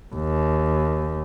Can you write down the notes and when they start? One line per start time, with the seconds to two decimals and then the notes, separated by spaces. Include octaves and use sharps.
0.15 D#2